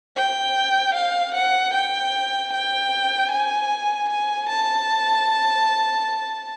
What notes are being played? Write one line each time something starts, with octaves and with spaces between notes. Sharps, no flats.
G5
F5
F#5
G5
G5
G#5
G#5
A5